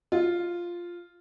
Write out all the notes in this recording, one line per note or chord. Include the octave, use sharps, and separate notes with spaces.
F4